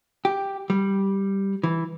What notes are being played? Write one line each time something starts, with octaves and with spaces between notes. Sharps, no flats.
G4
G3
E3